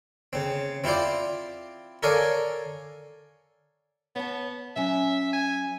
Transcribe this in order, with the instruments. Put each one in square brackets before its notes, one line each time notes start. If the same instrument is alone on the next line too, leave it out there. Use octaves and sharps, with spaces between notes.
[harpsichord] C#3 C4
C4 E4 F4 C5 D5
A4 A#4 C#5 D5 F5 G#5
[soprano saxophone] B3 [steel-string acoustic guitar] C#5 A5
[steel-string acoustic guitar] F#3 C#4 [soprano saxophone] E5
[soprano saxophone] G#5